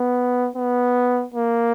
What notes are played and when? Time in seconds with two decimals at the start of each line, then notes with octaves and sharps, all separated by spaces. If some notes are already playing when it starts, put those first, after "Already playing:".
Already playing: B3
0.56 B3
1.34 A#3